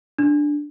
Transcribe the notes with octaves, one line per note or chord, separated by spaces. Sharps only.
D4